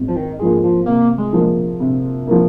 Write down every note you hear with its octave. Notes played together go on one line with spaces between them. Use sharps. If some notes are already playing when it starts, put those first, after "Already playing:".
Already playing: G#1
F3
D#3
G#2 F3 G#3 A#3 F4
F3
C3 A#3
G#3
F3 A#3
C3
F3 A#3